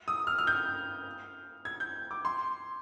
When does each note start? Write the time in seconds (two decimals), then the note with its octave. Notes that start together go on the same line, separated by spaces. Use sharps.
0.08 D#6
0.27 F6
0.38 F6
0.47 G6
1.65 G#6
1.80 G6
2.11 D6
2.25 C6